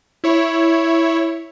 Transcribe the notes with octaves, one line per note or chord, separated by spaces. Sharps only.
E4 C#5